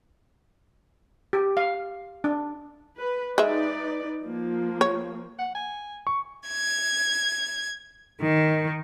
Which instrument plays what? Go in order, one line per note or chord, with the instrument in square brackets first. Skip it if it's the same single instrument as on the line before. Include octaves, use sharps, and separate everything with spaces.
[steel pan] G4
F5
D4
[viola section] B4
[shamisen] G#3 E5 [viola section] D#4 B4 D5
[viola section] F3 A#3
[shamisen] C#5
[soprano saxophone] F#5
G#5
[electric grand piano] C#6
[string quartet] G#6
D#3